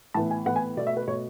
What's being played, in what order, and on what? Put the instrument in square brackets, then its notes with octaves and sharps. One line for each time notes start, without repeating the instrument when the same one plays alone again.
[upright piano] A2 E3 B3 A5
G#5
A2 E3 B3 F#5
G#5
B2 A3 D5
E5
B4
B2 A3 C#5